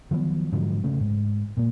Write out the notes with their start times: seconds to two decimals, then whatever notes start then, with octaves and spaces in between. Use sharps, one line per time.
0.11 D#3 F3 F#3 B3
0.52 G#2 D3 F3 F#3
0.84 C#3 A3
1.00 G#2
1.57 A#2 A#3